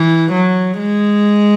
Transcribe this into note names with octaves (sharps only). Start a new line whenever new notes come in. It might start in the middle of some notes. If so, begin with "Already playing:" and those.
Already playing: E3
F#3
G#3